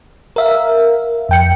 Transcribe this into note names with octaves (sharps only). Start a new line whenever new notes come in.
A#4 E5 F5
F2 G5 C#7